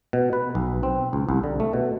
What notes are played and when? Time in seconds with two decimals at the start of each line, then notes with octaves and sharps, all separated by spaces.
0.13 B2
0.33 B4
0.55 B1
0.83 C4
1.13 C#2
1.29 C2
1.44 D3
1.60 A3
1.73 B2